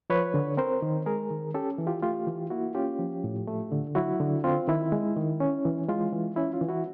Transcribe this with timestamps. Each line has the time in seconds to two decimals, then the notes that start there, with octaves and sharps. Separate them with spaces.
0.10 F3 B4 C#5
0.34 D3
0.57 C4 A#4 C5
0.82 D#3
1.06 G#3 G#4 A#4
1.30 D#3
1.54 C#4 G4 A4
1.78 E3
1.87 F4 G4
2.02 A3 F4 G4
2.27 E3
2.50 A#3 E4 F#4
2.74 C#4 F4 G4
2.99 F3
3.24 A2
3.47 A3
3.72 D3
3.95 F#3 E4 F#4
4.20 D3
4.44 C4 F4
4.68 D#3 E4
4.92 G#3
5.17 D#3
5.40 C#4
5.65 E3
5.88 G#3 F4
6.12 E3
6.36 C#4 E4
6.53 F4
6.61 E3
6.69 E4 F#4